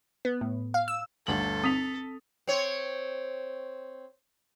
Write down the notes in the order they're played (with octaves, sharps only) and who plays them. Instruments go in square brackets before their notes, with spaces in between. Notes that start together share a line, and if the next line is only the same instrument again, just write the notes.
[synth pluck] B3
A2
F5
E6
[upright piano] G1 D2 F#7 [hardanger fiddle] A4
[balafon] C4 [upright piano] D#6 B6 F7
[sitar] C4 C#5